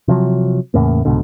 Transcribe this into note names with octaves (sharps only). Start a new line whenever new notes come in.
C3 F3 F#3
E2 A2 C#3 A#3
C2 G#2 B2 D3